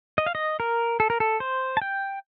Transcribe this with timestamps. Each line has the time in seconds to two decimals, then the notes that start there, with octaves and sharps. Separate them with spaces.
0.18 D#5
0.26 F5
0.35 D#5
0.60 A#4
1.00 A4
1.10 A#4
1.20 A4
1.40 C5
1.77 A5
1.82 G5